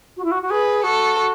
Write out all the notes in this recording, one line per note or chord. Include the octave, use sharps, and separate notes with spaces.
F#4
E4
F#4
F#4
G#4 B4
F#4 A4